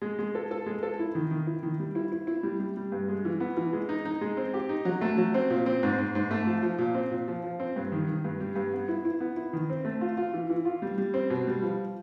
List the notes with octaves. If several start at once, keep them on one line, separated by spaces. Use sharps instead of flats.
G#3
G#3
A4
A4
G#3
A4
E4
D#3
D#3
E4
D#3
G3
E4
E4
E4
G3
G3
G3
G2
G#3
E3
B3
E3
G#3
D#4
D#4
G#3
C4
G4
D#4
F#3
A3
F#3
C4
A#2
C4
G#2
G#2
G#2
A3
F3
F3
A#2
C4
A#2
F3
F3
C4
G2
D#3
D#3
G2
G3
G2
B3
E4
E4
B3
E4
D#3
C4
A3
F4
F4
E3
E3
F4
G3
G3
C4
B2
G3
F3